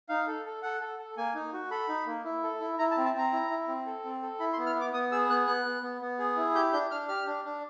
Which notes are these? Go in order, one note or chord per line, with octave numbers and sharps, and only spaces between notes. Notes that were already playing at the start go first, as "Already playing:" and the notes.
D#4 F5
A4
A4
A4 F#5
A4
A4
A#3 G#5
D#4
F#4
A4 B5
D#4
A#3
E4
A4
E4
E4 A#5
A5
C4
A5
C4 A#5
E4
E4
C4
A4
C4
A4
E4 B5
C6
B3
F6
B3 D6
B3 D#6
G#4 E6
B3 F#6
B3 F#6
B3
B3
B3
G#4
E4
G4 G6
D4 G6
D4 F6
G4 F6
D4
D4